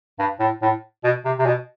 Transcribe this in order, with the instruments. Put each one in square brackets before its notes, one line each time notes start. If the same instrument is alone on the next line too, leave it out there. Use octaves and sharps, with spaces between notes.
[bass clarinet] G2
A2
A2
B2
C3
C3
B2